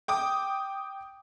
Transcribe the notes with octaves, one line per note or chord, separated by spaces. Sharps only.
G5 D6 D#6